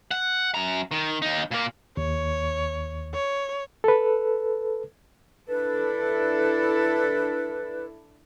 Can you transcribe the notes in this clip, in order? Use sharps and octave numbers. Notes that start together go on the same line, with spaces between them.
F#5
F#2 A#5
D#3
D#2 D#4
A#2 A#3
D#2 C#5
C#5
A4 B4
D4 E4 A4 B4